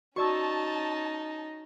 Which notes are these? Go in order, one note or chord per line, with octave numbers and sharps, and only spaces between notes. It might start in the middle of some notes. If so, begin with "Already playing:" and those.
C#4 D#4 F#4 D5 A5 C#6 E6